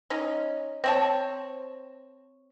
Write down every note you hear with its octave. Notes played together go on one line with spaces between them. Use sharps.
C#4 D#4
C4 C#5 A5